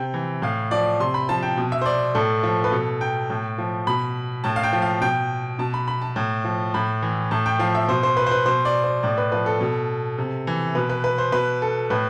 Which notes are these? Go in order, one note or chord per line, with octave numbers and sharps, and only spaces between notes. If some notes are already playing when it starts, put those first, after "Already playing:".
Already playing: C3 G5
E3
A2 F5
F3 D5
C3 C6
B5
F3 A5
G5
B2
E5
C5
D5
A2 A4
F3
B4
B2 A4
G5
A2
F3
B2 B5
A2 A5
F5
G5
F3
F5
B2 G5
B2 A5
B5
B5
A5
A2
F3
A2 B5
E3
A2 A5
G5
F3 F5
E5
B2 C5
C5
B4
C5
B4
B2 C5
D5
C5
A2 D5
B4
F3 B4
A4
B2
C3
E3
B2 B4
B4
B4
C5
B2 B4
A4
A2 B4